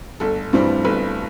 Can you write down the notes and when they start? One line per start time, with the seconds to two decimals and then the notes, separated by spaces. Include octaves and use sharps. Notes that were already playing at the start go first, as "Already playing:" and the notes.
0.20 G1 A4
0.53 G2 E3 G3 C4
0.85 G1 B4